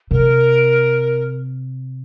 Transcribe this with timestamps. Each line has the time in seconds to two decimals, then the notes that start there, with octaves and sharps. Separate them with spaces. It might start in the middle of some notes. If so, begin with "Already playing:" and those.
0.11 C3 A#4